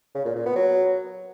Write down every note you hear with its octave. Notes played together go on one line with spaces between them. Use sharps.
C#3
A#2
A#2
B3
F#3